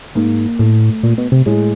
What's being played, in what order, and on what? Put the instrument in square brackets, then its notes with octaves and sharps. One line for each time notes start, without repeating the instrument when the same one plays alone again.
[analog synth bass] G#2 [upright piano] A#3
[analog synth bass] A2 [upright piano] A3
[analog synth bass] A#2
B2
C3
[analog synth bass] A2 [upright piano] G#3